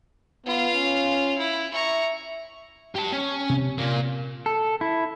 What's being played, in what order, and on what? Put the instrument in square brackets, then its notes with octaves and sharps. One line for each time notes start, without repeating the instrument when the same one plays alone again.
[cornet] B3 [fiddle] F4 F5
[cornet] C#4
[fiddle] E4
[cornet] E5 [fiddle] A#5 C#6
[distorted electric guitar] G4 A5
C#4
[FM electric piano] C3
[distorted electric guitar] A#2 A#3
[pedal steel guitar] A4
E4